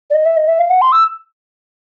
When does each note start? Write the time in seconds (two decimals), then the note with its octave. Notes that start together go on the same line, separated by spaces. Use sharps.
0.10 D5
0.14 D#5
0.26 E5
0.37 D#5
0.48 E5
0.59 F5
0.70 F#5
0.82 C6
0.92 E6